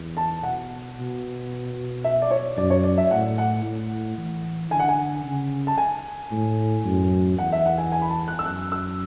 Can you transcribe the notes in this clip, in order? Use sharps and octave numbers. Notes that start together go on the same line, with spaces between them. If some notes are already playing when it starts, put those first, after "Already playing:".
Already playing: E2
A5
B2 F#5
B2
E5
D5
C#5
F#2 D5
C#5
D5
E5
A2 F#5
F#5
A2
E3
D3 G#5
F#5
G#5
C#3
A5
G#5
A2
F#2
E2 F#5
E5
F#5
G#5
G#5
B5
A5
F#6
E6
F#2 F#6
E6